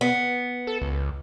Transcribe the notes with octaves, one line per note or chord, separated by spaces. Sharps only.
B3
A4
C#2